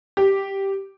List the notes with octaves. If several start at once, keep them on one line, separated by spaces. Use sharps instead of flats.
G4